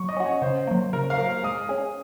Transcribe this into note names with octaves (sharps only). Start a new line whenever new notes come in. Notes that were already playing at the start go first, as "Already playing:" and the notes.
Already playing: F#3 C#6
D#5
C#4 F#4
C#5
C#3 C5
F#3 A#3
C#3 A#4
F5
F#3 A#3
G#3 D#6
C#4 G#4